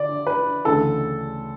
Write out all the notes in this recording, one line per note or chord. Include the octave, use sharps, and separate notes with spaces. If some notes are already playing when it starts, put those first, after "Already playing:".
Already playing: D3 D5
B4
D2 C#3 E3 A4